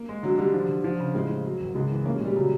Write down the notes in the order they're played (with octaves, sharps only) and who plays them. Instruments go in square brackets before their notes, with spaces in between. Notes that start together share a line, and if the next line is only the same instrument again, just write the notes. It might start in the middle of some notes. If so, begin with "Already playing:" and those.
Already playing: [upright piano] A#3
[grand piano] G#3
[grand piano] D3 [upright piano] F#3
[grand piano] D3 [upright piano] G3
[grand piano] F3
D3
F3
C#3
[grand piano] A2 [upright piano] G#3
[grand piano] F3
F#3
G#1
[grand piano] C#2 [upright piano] G#3
[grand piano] E3
[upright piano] A#3 [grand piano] C#4
[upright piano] G#3
[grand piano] A#2
[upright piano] G3
[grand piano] C#3 [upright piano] F#3